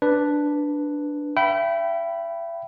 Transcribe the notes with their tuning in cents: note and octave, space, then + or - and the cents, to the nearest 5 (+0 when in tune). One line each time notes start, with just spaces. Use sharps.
D4 +0 B4 +0
E5 +35 G5 -30 B5 +0